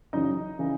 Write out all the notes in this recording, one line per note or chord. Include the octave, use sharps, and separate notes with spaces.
F#2 C#3 E3 D#4 D#5
C#3 E3